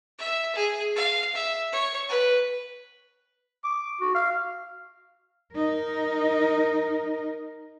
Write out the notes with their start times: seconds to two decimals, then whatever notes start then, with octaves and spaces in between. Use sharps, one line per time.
0.19 E5
0.55 G#4
0.96 F5
1.35 E5
1.72 C#5
2.09 B4
3.64 D6
4.00 F#4
4.15 F5
5.55 D#4 A#4